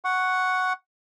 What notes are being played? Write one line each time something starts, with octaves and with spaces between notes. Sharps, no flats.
F#5 C#6